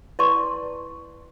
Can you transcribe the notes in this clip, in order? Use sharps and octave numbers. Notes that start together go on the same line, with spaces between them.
E4 B4 D5 A5 C6 C#6